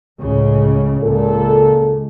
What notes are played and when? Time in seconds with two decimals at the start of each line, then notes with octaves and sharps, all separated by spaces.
0.20 C#2 A2 C#3
1.01 C#2 A#2 A4